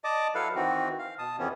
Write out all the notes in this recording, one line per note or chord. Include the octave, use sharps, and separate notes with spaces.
D5 D#5 A5 D6
F#3 E4 A4 B4 F5
D#3 E3 C4 F#4
F5
B2 A5 D#6
F2 C3 E3 B3 C#4